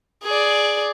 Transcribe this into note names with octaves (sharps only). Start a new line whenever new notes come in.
G#4 D5